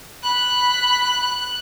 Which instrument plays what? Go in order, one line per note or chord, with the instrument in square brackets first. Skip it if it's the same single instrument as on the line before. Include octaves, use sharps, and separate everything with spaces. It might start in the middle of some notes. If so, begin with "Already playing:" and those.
[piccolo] B5 [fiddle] F#6